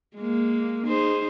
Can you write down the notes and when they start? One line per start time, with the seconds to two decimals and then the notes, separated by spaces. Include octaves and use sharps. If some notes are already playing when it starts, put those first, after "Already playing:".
0.17 G#3 A#3
0.87 D#4 G#4 C5